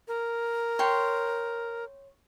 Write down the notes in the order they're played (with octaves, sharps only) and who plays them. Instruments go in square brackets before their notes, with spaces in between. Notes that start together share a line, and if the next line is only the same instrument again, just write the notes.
[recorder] A#4
[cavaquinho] C#5 G5 C6